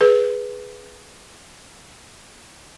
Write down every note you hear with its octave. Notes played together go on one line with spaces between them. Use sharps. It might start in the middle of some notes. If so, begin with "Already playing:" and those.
G#4 B4